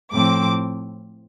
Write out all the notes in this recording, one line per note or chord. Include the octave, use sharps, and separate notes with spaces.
A2 F3 C4 D6